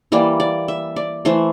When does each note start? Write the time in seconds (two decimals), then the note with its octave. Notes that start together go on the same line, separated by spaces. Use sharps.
0.12 E3 G3 A#3 D5
0.40 D5
0.68 E5
0.96 D5
1.25 E3 A3 C5